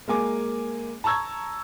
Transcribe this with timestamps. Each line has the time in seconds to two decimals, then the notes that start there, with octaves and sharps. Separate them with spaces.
0.08 G#3 A#3 G#5 D6
1.04 A5 A#5 C#6 E6 G#6